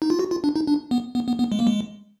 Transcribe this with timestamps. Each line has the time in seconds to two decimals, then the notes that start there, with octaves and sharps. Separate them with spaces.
0.02 D#4
0.10 F4
0.19 F#4
0.31 F4
0.44 D4
0.56 D#4
0.67 D4
0.91 B3
1.15 B3
1.28 B3
1.39 B3
1.52 G#3
1.59 A#3
1.67 G#3